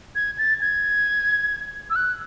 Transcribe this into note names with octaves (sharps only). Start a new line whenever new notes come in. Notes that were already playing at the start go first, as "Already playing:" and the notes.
G#6
A6
G#6
E6
F#6